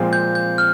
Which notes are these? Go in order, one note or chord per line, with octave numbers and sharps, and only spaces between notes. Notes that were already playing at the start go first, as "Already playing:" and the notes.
Already playing: A#2 F3 G#3 C4
G6
G6
F6